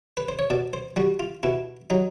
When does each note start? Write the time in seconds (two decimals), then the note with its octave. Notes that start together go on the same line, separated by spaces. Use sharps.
0.17 B4
0.29 C5
0.39 C#5
0.50 B2 D5
0.73 C5
0.96 G3 F#4
1.20 F4
1.43 B2 E4
1.90 F#3 D#4